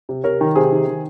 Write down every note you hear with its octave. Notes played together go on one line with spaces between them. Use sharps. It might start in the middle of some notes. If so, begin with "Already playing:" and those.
C3
C3 A#4 C#5
D#3
C3 G#4 C5
D#3
D#3